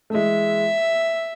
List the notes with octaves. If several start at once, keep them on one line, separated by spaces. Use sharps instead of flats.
A3
E3 G#3 E5